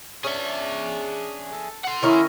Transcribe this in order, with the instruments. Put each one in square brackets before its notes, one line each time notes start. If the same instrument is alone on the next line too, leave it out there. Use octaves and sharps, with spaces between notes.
[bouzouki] C#4 D4 [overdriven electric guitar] G#4 E5
[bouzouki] A4
[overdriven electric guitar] F#5 C6
[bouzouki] D#3 C#4 A#4 [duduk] E4